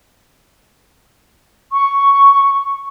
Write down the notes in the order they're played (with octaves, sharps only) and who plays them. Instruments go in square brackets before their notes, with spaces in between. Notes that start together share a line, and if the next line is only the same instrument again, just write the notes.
[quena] C#6